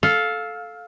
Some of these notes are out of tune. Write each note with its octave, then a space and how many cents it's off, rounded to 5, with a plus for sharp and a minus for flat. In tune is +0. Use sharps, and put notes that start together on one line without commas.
A4 -10 F5 +10